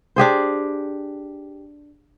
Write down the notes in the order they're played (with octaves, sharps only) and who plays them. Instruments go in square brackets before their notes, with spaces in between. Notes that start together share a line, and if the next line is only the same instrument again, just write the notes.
[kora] D4 G4 G#4 C5